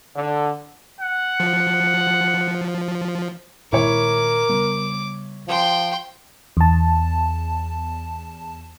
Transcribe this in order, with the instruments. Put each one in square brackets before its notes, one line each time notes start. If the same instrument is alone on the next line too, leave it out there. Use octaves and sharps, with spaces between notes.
[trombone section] D3
[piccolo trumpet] F#5
[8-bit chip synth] F3
[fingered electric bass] A#2 D#3 G#3 [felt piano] E4 C#5 [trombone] A#4 [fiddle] D6
[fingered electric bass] C#3 G3 B3
[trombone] F3 [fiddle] G5 C6
[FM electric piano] E2 A5